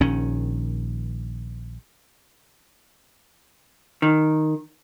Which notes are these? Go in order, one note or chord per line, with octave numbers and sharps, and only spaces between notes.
A#1 D#3 C#4
D#3